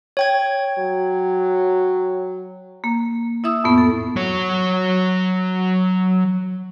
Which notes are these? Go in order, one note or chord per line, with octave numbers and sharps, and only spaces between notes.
C#5 G5 G#6
F#3
A#3
E4 E5 D#6 E6
F2 A2 B3
A4
F#3 C#5